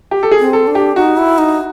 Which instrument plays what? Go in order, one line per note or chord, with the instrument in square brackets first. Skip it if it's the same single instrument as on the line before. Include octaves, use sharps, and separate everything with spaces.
[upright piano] G4
A4
G#4
[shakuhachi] C4
[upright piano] A4
[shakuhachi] D4
[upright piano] G4
[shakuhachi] D#4 [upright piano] F#4
[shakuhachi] E4
D#4